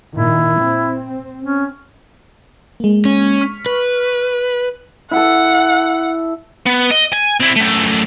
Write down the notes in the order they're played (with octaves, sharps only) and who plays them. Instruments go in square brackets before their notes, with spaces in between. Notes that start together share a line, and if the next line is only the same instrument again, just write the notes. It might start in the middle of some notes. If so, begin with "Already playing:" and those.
[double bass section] A#2 D#3 [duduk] E4
[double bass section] C4
[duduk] C#4
[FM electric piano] G#3 A#3
[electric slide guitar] C#4
[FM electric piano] C#6 F6 B6
[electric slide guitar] B4
[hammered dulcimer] E4 A4 [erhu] F#5
[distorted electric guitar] B3
D#5
G#5
C4 E4
F#2 A3